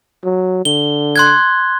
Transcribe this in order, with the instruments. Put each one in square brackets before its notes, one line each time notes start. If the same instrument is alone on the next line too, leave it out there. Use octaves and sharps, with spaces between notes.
[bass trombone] F#3
[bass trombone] D3 [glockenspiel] G7
[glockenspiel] C6 F#6 G#6